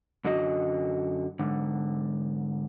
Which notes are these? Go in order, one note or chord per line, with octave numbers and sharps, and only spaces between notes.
F#2 D3 F#4 D#5
G#2 D3